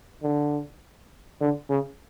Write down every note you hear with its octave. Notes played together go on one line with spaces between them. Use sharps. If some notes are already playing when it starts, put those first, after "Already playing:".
D3
D3
C#3